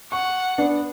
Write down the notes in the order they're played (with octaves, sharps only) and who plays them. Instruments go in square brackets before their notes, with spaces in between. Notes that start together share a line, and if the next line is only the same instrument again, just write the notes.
[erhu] F#5 [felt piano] C#6
[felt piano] B3 D4